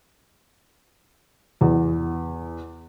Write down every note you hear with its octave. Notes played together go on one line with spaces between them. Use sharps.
E2